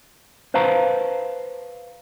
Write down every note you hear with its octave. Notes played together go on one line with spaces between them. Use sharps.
B4 C5 F5 A5 A#5